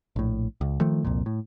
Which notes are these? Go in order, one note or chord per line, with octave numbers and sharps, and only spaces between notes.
A#1 A2
C#2
D#3 F3 A3
C2 F2 A#2
A2